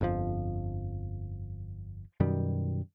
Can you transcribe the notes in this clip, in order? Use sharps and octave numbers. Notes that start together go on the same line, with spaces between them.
G1 F2 A2 F3
F#2 B2 D#3 G3